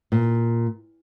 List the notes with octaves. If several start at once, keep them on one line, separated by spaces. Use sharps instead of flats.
A#2